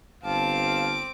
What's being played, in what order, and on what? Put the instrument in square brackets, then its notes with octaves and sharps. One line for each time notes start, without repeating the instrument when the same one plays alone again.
[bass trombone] G1 [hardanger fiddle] C4 D6 [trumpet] F5 [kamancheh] A5